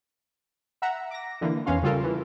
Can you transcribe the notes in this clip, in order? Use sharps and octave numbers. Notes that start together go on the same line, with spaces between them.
E5 F#5 A#5
D6 A#6
D3 E3 A#3
E2 E3 C#4 F5 C6
C#3 G3 F4 A4 A#4
E3